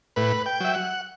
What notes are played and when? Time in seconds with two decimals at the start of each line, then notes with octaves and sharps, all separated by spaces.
0.16 A2 B4
0.46 G5
0.60 F#3 E5
0.75 F#5